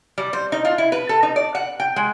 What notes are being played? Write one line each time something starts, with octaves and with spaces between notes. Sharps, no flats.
G3
C5
D#4
F4
E4
B4
A4
D#4
D5
F#5
G5
G#3